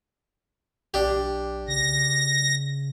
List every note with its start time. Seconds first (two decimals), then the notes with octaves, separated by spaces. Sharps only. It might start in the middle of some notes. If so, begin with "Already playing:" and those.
0.94 B1 D4 G4
1.68 C#3 A#6